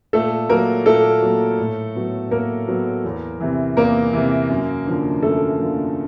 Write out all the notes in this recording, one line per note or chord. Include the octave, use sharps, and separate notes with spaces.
A#2 A3 A4
F#3 A#3 A#4
A#2 A3 A4
F#3 A#3
A2
F#3 B3
A2 A#3 A#4
F#3 B3
E2
C3 E3
E2 A#3 A#4
C3 E3
F#2
D3 F3 A#3
F#2 A3 A4
D3 F3 A#3